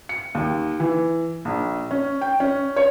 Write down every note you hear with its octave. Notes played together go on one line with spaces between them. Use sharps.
C#7
D#2
E3
A#1
C#4
G5
C#4
C#5